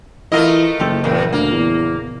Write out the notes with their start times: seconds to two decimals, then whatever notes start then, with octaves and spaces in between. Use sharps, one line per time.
0.32 E3 A3 E4 F4 A#4 D#5 F5
0.79 F#1 F3 G4 A4
1.04 E2 A#2 C#3 G5
1.32 D2 A#3
1.52 E2